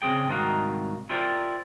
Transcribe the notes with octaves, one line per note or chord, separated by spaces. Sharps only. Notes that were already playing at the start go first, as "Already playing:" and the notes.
C#3 F#3 C4 G#4 G5
C2 G#2 D#3 D#4 F#4 F5
E4 F4 G4 A#4 C5 D5